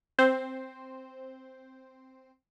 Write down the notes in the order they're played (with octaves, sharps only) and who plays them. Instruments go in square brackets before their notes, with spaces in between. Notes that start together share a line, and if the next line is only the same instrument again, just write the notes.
[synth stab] C4 C5